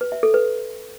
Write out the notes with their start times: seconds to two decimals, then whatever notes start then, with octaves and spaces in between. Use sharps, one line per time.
0.01 B4
0.12 E5
0.23 A4
0.34 B4